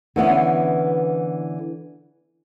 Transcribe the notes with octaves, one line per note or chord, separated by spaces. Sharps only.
D3 E3 B3 C#4